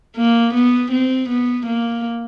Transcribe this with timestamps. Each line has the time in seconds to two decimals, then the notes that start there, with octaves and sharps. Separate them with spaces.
0.16 A#3
0.54 B3
0.91 C4
1.29 B3
1.66 A#3